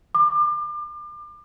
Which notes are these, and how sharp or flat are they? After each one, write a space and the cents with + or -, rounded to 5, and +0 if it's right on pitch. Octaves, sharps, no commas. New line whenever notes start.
D6 +35